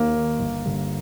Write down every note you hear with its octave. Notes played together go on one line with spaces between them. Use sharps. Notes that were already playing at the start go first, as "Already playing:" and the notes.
Already playing: D#2 A#3
D#3
G1
G2 D3